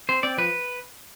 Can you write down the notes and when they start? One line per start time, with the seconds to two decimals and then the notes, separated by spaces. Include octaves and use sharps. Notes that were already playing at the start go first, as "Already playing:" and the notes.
0.09 C4 C5
0.23 C4 D5
0.38 F3 B4